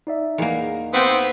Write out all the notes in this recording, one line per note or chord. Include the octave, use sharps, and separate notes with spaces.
D#4 D5 E5
E2 A#3 D#4 G#4 A#4
B3 C4